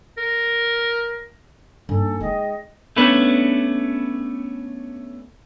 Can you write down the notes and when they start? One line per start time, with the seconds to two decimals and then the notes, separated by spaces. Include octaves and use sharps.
0.17 A#4
1.89 G2 A#3 D#4 A4 G#5
2.20 G#3 D#4 G#4 D#5 G5 D#6
2.96 A3 B3 C#4 D4 B4